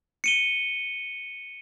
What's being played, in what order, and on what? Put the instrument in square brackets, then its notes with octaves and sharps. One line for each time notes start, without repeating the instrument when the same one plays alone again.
[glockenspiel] C#7 D#7 G7